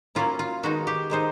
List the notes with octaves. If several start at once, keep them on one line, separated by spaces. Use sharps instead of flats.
F#3 A#3 C#4 E4 F4
F4
D#3 G#3 B3 D#4 F#4
G4
D#3 G#3 B3 D#4 C5